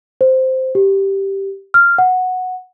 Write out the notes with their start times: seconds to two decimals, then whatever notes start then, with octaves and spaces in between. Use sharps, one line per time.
0.21 C5
0.75 G4
1.74 F6
1.98 F#5